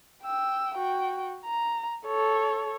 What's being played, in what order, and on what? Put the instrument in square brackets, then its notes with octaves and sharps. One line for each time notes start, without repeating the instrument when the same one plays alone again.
[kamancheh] G5 E6
F#4 G5
A#5
A4 C#5